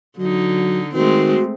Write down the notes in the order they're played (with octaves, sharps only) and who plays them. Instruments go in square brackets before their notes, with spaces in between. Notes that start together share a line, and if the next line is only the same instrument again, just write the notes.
[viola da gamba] D3 D#4 [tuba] F#3
[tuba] D#3 [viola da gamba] G#3 A3 C4 [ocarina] F#4